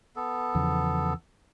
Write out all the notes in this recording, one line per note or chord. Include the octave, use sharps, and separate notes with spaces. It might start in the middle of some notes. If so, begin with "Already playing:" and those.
B3 A4
E2 C#3 F3